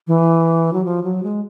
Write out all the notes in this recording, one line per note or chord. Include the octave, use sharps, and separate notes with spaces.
E3
F#3
F3
F#3
G#3